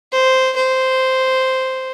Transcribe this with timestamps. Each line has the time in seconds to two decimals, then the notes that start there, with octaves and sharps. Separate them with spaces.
0.12 C5
0.56 C5